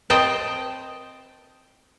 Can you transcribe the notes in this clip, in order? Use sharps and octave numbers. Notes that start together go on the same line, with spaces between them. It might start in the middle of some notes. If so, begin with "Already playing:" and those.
C4 D#5 G5 A5